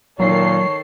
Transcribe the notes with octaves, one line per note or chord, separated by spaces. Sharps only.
A#2 D#3 F#3 A4 C#5 C7